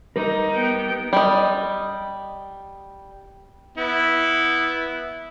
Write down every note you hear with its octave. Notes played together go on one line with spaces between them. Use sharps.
G3 D#4 A#4
B3 G5
G3 D#5
B3 E4